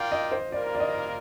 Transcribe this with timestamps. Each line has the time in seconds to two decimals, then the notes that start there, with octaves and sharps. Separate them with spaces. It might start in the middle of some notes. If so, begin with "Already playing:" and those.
Already playing: F4 A#4 D5 F5 G5
0.12 D#5
0.32 C5
0.52 G3 A#3 F4 A#4 D5
0.75 D5
0.80 D#5